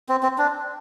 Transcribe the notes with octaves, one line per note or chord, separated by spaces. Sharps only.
C4
C4
D4